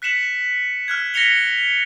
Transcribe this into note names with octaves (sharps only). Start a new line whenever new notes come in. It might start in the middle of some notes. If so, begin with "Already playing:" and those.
F#6 B6 C#7 E7 F#7
F6 F#6 G#6
A#6 B6 C#7 F7 G7